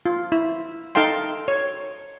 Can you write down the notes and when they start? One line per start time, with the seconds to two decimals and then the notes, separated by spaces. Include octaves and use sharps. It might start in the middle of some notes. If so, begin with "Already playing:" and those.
0.06 F4
0.32 E4
0.95 D#4 A4 F5 G5 C6
1.48 C#5